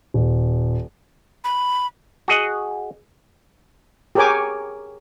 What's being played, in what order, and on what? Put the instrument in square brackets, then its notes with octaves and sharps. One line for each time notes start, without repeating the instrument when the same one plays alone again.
[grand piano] D#1
[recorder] B5
[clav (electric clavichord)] F#4 G#4 D#5 F#5
[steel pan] G4 G#4 A#4 C#5 G#5 D6